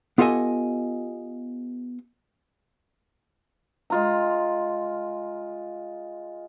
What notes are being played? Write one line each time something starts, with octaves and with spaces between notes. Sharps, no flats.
B3 F4 G4 A4 D#5 G#5
G#3 F4 A#5